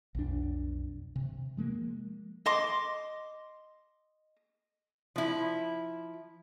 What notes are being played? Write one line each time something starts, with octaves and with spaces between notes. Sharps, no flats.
B1 F2 D4
C3
F3 G#3 A#3
D#5 C6 D6
F3 E4